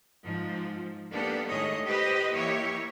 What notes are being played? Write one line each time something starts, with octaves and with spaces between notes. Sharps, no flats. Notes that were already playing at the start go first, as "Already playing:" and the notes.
G#2 F3
A#3 B3 D4 G4 A4
A2 D#3 G#3 G#4 C#5 D#5
G4 B4 C5 D#5
E3 A#3 E4 G4 C#5